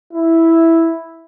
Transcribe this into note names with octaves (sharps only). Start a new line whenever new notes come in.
E4